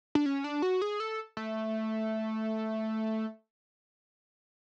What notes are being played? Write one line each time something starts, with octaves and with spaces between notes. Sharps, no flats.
D4
C#4
D4
F#4
G#4
A4
A3